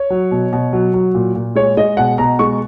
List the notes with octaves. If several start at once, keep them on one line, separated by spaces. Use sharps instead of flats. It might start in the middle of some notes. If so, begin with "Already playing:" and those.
Already playing: C#5
F#3
B2
B2
F#3
F#3
A#2
A#2
G#3 C#5
G#3 D#5
B2 F#5
B2 A#5
G#3 C#6